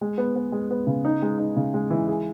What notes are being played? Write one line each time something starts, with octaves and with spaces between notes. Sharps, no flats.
G#3
B3
B3
G#3
B3
C#3
D#4
G#3
D#4
C#3
G#3
E3
G#4